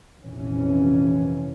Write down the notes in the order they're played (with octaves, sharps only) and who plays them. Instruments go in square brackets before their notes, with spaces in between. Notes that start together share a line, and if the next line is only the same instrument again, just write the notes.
[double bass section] F1 A#1 F2 E3 C#4